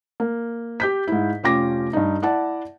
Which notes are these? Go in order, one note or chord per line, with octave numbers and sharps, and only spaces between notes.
A#3
G4 G6 B6
G#2 E4
F1 C#4 F4 G5 D6 A#6
G2 D#4
E4 D5 F#5 A5